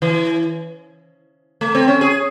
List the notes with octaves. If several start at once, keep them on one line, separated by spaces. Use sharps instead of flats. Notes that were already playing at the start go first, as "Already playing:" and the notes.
E3
A3
C4
C#4
G#4